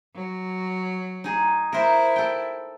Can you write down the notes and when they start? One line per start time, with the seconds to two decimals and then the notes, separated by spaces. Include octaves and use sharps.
0.15 F#3
1.24 D#4 G#4
1.73 E4 A#4 C5
2.16 A4 G5